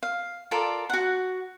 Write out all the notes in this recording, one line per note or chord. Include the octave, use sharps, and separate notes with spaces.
F5
F4 A4 A#4 D5
F#4 F#5